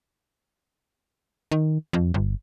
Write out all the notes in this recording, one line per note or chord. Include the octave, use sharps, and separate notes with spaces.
D#3
F2
G1